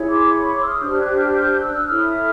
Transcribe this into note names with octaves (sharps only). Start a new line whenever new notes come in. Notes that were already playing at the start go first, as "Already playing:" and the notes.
Already playing: E4 G#4 C#5
C6 D6
B5 C#6
C6 D6
E6
D#6 F6
D4 G4 C5 F6 G6
G6
F#6 G#6
F6 G6
F6 G6
E6 F#6
E4 A4 C#5 D#6 F6